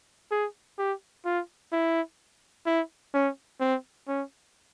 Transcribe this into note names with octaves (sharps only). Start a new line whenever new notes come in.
G#4
G4
F4
E4
E4
C#4
C4
C#4